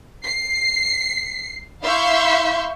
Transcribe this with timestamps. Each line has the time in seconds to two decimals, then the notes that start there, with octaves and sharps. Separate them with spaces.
0.25 C7
1.82 E4 E5 F5 C6 C#6 G6